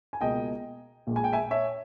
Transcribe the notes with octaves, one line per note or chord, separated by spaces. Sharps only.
G#5
C#2 B2 A#3 D#5 G5
A#1 A#2 G#3
G#5
G5
E5 G#5
C#5 E5